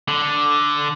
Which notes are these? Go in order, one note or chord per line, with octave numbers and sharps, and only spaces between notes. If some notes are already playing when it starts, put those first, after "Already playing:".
D3